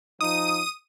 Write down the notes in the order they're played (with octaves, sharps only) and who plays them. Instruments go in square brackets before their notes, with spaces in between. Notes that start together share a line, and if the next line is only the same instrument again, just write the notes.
[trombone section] F3 D#4 [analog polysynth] D#6 D#7